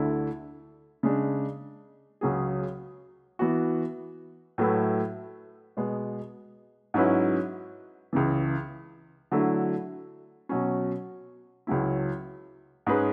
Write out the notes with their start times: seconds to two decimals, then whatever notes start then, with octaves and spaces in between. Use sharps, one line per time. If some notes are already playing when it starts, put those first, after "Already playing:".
Already playing: D2 D3 A3 E4 A4
1.03 C#3 G#3 D4
2.21 C#2 C#3 F#3 C#4 G#4
3.39 E3 B3 F#4
4.58 A2 F#3 A3 E4 B4
5.77 B2 G#3 B3
6.94 G#2 F#3 C#4 E4 B4
8.13 C#2 C#3 E3
9.32 D3 F#3 A3 E4
10.49 B2 F#3 C#4
11.67 C#2 C#3 F#3 C#4 E4
12.87 G#2 G#3 C#4 G#4 B4